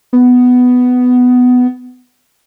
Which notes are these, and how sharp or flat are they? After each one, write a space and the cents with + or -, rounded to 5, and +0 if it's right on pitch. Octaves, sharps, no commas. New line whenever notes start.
B3 +10